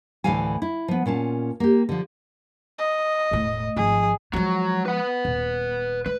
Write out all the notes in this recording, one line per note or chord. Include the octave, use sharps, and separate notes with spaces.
D2 A2 E3 A4 F5 G#5
E4
F3 B3
A#2 C#4 F4 A5
A#3 G4
D3 F3
D#5
E1 A2
G#1 F3 G#4
F3 F#3 G#3
B4 F#5
D#1
A3 B4